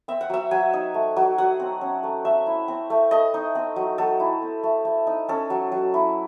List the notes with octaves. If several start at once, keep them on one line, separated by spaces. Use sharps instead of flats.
C4 E5
F#5
F#3 E5
F#3 G#5
D#4
A3
F#3
F#3 F#5
C4
C#4
A3
A3 E5
E4
C4
A3
A3 D#5
D#4
C4
F#3
F#3 A4
E4
C4
A3
A3
D#4
C#4 A4
F#3
F#3
E4